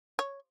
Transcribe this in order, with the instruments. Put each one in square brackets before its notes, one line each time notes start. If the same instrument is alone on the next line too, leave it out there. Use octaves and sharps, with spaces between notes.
[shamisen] C#5